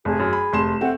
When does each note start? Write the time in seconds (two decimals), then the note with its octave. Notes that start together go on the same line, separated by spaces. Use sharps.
0.05 F1 G#4
0.19 F#2
0.33 B5
0.53 F1 C6 E7
0.81 A3 C4 F#5